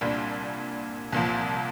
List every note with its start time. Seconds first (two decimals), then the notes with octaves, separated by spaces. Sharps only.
0.01 C2 A#2 G3 D4
1.12 C2 A#2 F3